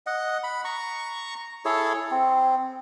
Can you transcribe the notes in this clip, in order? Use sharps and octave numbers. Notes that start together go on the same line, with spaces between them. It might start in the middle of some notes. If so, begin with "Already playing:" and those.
D#5 F#5
B5
A#5 C#6
E4 G#4 A4 C#5
C4